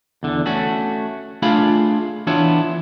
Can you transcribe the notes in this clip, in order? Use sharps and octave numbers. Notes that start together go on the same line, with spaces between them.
E2 D3
A3 C#4 F#4
A3 D4 F4 G#4 F5 B5
E3 B3 D4 E4 F4 C#5